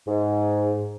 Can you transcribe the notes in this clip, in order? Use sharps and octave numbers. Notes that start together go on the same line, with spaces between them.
G#2